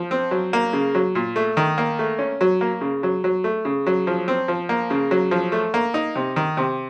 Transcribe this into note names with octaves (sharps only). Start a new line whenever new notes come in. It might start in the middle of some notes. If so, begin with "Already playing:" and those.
Already playing: F3
C4
F#3
A#3
C#3
F#3
A#2
A3
D#3
A#3
A3
C#4
F#3
A#3
C#3
F#3
F#3
A3
C#3
F#3
F3
C4
F3
A#3
C#3
F#3
F3
A3
A#3
D#4
C3
D#3
C3